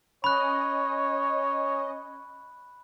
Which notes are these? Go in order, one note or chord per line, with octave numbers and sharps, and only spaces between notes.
C#4 C#5 D#5 B5 F#6